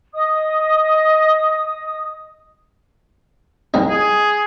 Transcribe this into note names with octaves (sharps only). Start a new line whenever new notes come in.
D#5 D#6
C2 D#4
G#4